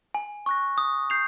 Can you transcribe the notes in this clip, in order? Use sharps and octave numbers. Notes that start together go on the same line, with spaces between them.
G#5
C#6 F#6 A#6
D#6
G6 C7 F7